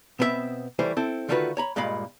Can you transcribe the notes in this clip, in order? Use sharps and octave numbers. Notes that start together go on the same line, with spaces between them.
B2 B3 C4 A#4 E5
E3 G3 A3 C5
C4 E4 A4
D3 D#3 A3 F4 F#4 B4
C#5 A#5 B5
G2 A#2 G#3 D#5 F5 B5